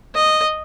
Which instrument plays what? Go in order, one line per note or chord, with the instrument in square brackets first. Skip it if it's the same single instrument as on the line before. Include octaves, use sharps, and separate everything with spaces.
[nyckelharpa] D#5